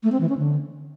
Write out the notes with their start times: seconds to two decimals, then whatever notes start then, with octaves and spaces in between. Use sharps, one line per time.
0.03 A3
0.12 C4
0.21 E3
0.29 C#4
0.38 D3